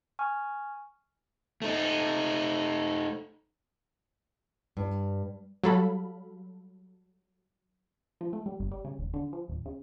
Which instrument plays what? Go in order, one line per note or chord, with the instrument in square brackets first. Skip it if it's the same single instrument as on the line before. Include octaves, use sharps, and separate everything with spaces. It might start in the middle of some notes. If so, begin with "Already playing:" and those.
[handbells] G#5 C#6 F6
[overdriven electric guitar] A3 D#4
[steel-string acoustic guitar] G2
[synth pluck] F#3 G3 A4 F5 B5
[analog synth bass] F3
A3
G3
G1
G3
C#3
E1
D3
F3
D#1
C#3